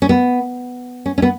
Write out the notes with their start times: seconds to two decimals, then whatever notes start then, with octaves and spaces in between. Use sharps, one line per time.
0.02 C#4
0.09 B3
1.06 C#4
1.18 C#4
1.22 B3